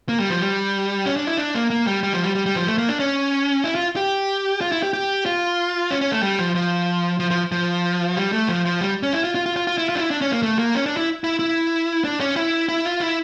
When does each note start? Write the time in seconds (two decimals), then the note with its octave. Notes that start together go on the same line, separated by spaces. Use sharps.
0.09 A#3
0.20 G3
0.30 F3
0.41 G3
1.06 C#4
1.16 D4
1.27 E4
1.38 D4
1.55 A#3
1.70 A#3
1.87 G3
2.03 G3
2.13 F3
2.24 G3
2.35 G3
2.46 G3
2.56 F3
2.67 A3
2.78 A#3
2.89 D4
3.00 C#4
3.64 E4
3.75 F4
3.96 G4
4.61 F4
4.72 E4
4.83 G4
4.93 G4
5.26 F4
5.91 C#4
6.01 C#4
6.12 A3
6.23 G3
6.39 F3
6.55 F3
7.20 F3
7.30 F3
7.52 F3
8.17 G3
8.32 A3
8.49 F3
8.65 F3
8.81 G3
9.03 C#4
9.13 E4
9.24 F4
9.35 F4
9.46 F4
9.56 F4
9.67 F4
9.78 E4
9.89 F4
9.96 D4
10.00 E4
10.11 D4
10.21 C#4
10.32 A#3
10.43 A3
10.59 A#3
10.75 C#4
10.86 D4
10.97 E4
11.24 E4
11.39 E4
12.04 D4
12.20 C#4
12.36 E4
12.69 E4
12.85 F4
13.01 E4